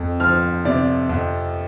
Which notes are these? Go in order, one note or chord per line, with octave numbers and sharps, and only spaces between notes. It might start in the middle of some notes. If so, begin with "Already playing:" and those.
Already playing: F2
F3 F6
C3 D5
F2